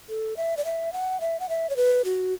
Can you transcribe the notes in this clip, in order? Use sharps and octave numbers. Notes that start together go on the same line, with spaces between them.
A4
E5
D5
E5
F#5
E5
F#5
E5
C#5
B4
F#4